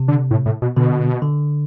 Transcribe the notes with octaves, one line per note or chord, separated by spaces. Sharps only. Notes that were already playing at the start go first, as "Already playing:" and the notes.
Already playing: C3
D3
A2
A2
B2
B2 D3
D3